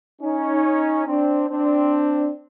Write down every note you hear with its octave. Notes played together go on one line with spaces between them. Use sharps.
C#4 D#4
C4 D4
C4 D4